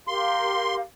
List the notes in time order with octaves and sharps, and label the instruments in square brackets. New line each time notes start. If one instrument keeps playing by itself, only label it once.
[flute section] G4 A#4 F5 [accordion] C6